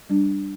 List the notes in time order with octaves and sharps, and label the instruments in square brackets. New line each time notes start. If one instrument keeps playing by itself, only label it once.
[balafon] G3 D4